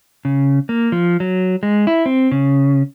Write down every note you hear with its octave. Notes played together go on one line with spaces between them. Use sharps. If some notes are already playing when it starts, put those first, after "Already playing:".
C#3
A#3
F3
F#3
G#3
E4
C4
C#3